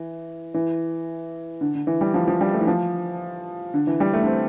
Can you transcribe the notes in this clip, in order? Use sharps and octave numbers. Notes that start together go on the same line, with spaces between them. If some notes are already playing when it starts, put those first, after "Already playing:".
Already playing: E3
E3
D3
D3
E3
G3
F3
F3
G3
A3
E3
F3
D3
E3
G3
A3
D4
C4